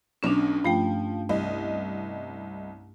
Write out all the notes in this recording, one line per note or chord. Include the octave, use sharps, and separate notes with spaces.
B1 B2 C#4 D4
G2 F3 A3 G5
C2 D#5